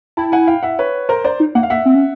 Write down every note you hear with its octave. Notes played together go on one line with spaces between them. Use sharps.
E4 G5 A5
F#5 G#5
F5 G5
E5 F#5
B4 C#5
A#4 C5
C5 D5
D#4
A#3 F#5
F5
A#3 E5 F#5
C4
C#4